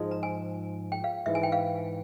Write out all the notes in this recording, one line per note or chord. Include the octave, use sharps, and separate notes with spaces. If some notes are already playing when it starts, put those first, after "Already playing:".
Already playing: G#2 F3 G#3
A#5
G#5
G5
F5
G#2 E3 G#3 E5
G#5
G5
F5